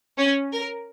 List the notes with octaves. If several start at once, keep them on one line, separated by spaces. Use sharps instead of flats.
C#4
A#4